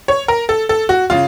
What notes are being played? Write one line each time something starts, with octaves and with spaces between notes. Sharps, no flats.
C#5
A#4
A4
A4
F#4
C#3 F4